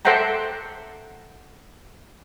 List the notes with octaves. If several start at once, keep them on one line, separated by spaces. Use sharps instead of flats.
A4 C5 E5 F#5 G5 A#5